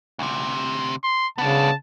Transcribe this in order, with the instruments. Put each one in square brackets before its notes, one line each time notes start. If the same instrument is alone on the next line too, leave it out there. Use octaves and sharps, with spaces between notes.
[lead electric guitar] D2 C3
[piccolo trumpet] C6
[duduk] C#3 [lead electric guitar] B3 D4 [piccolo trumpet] A5